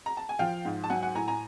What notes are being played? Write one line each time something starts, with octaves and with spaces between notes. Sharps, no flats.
A#5
A5
G#5
F3 F5 G5
G#2
A5
F#3 F#5 G#5
F#5 G#5
A2 G#5 A#5
G#5 A#5